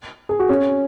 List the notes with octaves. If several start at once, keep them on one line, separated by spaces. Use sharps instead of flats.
G#4
F#4
C#4